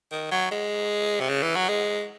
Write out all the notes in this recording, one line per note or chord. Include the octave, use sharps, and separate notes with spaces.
D#3
F#3
G#3
C3
C#3
E3
F#3
G#3